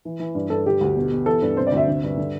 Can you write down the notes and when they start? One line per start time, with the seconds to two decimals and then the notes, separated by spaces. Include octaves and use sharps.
0.05 E3
0.20 E3
0.35 G2
0.50 G2 A4
0.66 D3 G4
0.81 D2
0.96 B2
1.11 B2
1.26 E3 A4
1.42 G2 B4
1.57 C3 C5
1.67 D5
1.72 D2
1.77 E5
1.88 D3
2.03 G2
2.17 D3